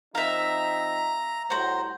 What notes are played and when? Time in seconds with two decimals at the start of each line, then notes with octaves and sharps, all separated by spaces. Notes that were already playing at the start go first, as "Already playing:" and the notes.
0.15 F3 C4 D#4 E5 F5 A#5
1.50 A2 G3 F#4 C5 A#5